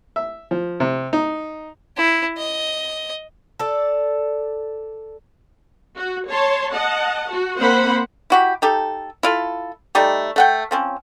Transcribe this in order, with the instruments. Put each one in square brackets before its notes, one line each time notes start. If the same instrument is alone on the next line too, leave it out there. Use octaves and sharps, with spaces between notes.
[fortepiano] E5
F3
C3
D#4
[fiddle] E4
D#5
[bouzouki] A4 D5
[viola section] F#4
C#5 A5 C6
D#5 F#5 A5
F#4
A#3 C4 C5 F#5 B5
[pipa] E4 F#4 G4
D#4 G4 A4
E4 F4 A4
G3 A3 D#4 G4
A3 F#5 G5
F3 C4 C#4